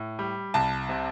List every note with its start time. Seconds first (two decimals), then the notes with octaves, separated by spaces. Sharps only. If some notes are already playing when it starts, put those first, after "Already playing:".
Already playing: A2
0.19 G3
0.54 C2 A5
0.89 C3